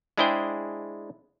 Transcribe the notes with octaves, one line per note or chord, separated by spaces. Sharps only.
G#3 D4 E4 G#4 C5 G5